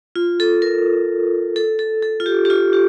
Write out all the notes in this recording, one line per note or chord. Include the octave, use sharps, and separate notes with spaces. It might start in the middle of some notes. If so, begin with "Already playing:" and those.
F4
A4
A#4
A4
A4
A4
F4
G4
G4
F4
G4